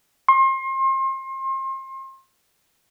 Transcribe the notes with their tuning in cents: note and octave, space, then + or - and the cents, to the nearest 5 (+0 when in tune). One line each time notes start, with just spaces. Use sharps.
C6 +35